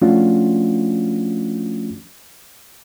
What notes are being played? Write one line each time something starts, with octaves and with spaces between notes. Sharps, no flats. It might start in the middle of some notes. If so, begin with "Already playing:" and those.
F3 A3 C#4 D4 F4 F#4